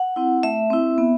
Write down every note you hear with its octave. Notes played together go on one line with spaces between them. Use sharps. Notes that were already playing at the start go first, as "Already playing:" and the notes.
Already playing: F#5
C4 E4
A3 E5
C4 E4
B3